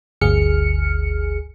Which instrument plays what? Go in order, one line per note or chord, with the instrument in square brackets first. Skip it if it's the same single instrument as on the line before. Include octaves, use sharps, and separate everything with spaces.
[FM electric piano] G1 D2 G#4 F6 C#7